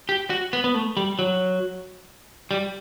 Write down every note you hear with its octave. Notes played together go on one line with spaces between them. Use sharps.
G4
F#4
B3
B3
A3
G3
F#3
G3